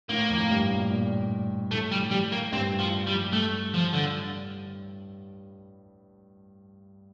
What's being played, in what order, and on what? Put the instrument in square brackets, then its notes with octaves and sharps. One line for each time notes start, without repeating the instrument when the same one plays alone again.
[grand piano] A2 [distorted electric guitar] A#3
[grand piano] F2
G2
A#2
A#2
[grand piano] A2 [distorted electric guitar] A3
[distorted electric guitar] G3
G3
A#3
[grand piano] G2 [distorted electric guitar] C4
[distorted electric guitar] F3
G3
A3
F3
D3